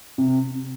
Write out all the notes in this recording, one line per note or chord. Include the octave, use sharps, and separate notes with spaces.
C3